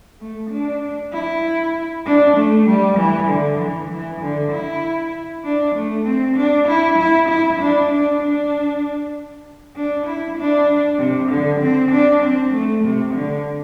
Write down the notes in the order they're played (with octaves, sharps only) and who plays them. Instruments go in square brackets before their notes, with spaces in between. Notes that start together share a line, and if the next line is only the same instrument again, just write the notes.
[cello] A3
D4
E4
D4
A3
G3
E3
D3
E3
E3
D3
E4
D4
A3
C4
D4
E4
E4
E4
D4
D4
D4
D4
E4
D4
C3
D3
C4
D4
C4
A3
C3
D3